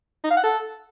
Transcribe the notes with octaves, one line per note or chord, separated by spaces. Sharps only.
D#4
F5
F#5
A4